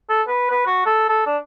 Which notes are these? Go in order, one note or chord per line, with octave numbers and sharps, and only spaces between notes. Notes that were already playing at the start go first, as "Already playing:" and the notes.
A4
B4
B4
F#4
A4
A4
D4